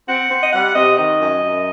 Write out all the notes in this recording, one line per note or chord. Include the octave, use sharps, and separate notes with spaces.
C4 F#5
C4
D#5
G3 F#5
C3 D#5
D#3 D#5
F#2
F#2